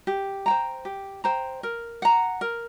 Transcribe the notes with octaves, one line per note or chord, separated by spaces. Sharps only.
G4
C5 G5 A#5
G4
C5 G5 A#5
A#4
F#5 A#5
A#4